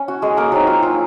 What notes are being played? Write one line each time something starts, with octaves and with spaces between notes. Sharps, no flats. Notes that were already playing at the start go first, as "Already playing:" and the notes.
Already playing: C#4
F#4
G#3 G#4
A#3 A#4
F#3 C4 D#4 F#4
F4
F4